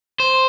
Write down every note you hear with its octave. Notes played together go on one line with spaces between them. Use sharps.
C5